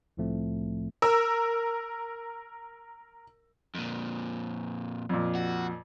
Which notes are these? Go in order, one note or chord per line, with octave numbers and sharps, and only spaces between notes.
C2 A2 F3 A3 C4
A#4 E6
F2 A#2
F2 A#2
F#4